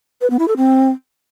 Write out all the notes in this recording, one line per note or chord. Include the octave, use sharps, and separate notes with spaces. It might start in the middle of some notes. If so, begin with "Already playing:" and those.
B4
B3
E4
A4
C4